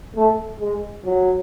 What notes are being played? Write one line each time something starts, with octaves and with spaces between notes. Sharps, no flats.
A3
G#3
F#3